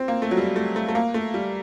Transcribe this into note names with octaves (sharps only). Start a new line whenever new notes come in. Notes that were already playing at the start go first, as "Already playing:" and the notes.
Already playing: C4
A#3
A3
F#3
G3
A3
A3
A3
A#3
A3
G3